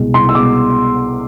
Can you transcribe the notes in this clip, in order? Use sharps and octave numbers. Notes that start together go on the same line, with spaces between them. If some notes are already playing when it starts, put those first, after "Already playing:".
Already playing: C2 B2 G#3
C2 C6
E6
B2 G#3 D6